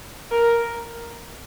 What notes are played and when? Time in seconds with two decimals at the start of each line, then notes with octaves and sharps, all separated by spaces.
0.31 A#4